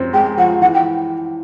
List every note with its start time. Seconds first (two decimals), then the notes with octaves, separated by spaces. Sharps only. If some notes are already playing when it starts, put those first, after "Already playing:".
Already playing: F#2 F3 C4
0.13 G#3 G5
0.38 F3 F#5
0.62 E3 F#5
0.75 G5